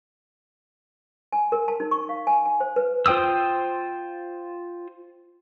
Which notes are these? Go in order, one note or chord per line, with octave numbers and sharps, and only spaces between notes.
G#5
A#4
A5
D#4
C#6
F5
G#5
G#5
C5
B4
F4 C5 G5 D#6 E6